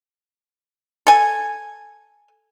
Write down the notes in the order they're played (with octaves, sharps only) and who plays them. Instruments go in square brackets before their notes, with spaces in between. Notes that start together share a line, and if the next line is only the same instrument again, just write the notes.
[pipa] A4 G#5